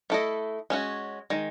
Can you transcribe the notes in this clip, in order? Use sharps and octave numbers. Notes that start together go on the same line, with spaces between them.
A3 E4 A4 D#5
G#3 C#4 F#4
D#3 G#3